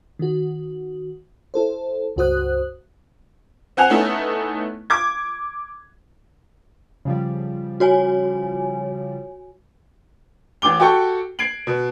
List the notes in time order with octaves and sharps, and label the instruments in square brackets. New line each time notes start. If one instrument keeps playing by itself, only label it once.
[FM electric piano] D#3 F#4
E4 A4 C5
C#2 G2 F#4 C5 D#6 F#6
[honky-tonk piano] C4 F#5 G#5 F7
A3 B3 C#4 D#4 E4
D6 G#6
[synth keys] C#3 F3 G3
[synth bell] F#4 C#5 G#5
[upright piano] A1 G4 D6 G7
F#4 G4 A4 G5 C#6
G#6 C7 D7 F#7
B2